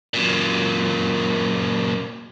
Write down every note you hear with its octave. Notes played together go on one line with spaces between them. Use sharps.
F#2 A#2